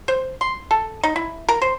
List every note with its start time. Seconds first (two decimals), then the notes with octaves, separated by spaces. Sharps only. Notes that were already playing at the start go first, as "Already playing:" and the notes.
0.08 C5
0.41 C6
0.71 A4
1.03 D#4
1.16 E4
1.49 A#4
1.62 C5